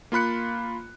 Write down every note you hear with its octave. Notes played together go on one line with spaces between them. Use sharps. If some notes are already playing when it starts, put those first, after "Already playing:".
A#3 F4 B5 F#6 C#7